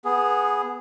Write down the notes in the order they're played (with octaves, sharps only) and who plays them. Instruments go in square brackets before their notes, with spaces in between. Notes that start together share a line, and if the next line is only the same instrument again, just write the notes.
[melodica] B3 G#4